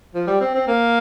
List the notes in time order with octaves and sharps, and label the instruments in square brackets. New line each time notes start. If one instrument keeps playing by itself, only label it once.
[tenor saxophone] F3
G3
C4
C4
A#3